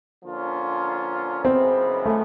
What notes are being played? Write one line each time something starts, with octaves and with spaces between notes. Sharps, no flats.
D3 F3 A#3 C#4 F4
F#2 C#3 E3 G#3 B3 C4
A3